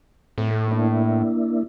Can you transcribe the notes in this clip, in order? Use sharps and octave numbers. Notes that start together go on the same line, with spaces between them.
A2 A3 C4
A3
A#3 D4 E4